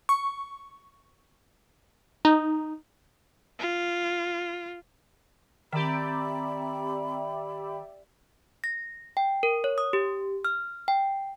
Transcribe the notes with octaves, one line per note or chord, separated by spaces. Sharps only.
C#6
D#4
F4
D#3 C4 G4 D5 E5 A#5 B5
A#6
G5
A#4
C#5
D#6
G4
F6
G5